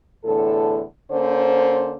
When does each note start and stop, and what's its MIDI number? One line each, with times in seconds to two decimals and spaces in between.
0.24 0.82 40
0.24 0.82 45
0.24 0.82 50
0.24 0.82 69
1.11 1.96 50
1.11 1.96 58
1.11 1.96 61
1.11 1.96 72